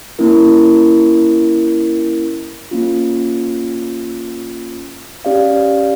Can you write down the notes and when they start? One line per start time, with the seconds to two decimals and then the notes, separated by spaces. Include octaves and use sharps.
0.19 A#3 C#4 E4 A#4
2.71 A#3 C#4 F4
5.25 C#4 G4 D5 F5